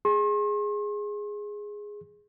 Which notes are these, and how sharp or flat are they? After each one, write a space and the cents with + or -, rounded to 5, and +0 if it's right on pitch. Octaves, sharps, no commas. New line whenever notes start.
G#4 -5 C6 +45